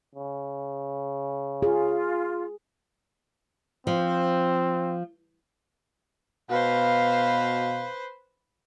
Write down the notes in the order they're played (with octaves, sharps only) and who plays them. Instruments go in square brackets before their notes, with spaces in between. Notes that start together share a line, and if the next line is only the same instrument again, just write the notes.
[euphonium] C#3
[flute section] F4 [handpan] G#4
[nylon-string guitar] F3 [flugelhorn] C4
[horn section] B2 F5 [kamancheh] B4 C5